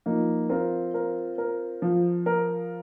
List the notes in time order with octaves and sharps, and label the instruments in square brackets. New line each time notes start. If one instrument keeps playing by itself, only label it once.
[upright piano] F3 [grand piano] A#3 D#4
[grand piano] C4 F4 [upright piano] A#4
[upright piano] A#4
A#4
F3
A#4